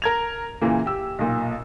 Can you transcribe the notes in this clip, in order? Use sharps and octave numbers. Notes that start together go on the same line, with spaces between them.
A#4 G#6 F7
A#2 C#3 E3 A#3
G4 E6
B1 A#2